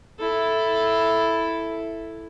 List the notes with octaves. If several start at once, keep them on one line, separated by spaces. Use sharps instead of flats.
E4 A4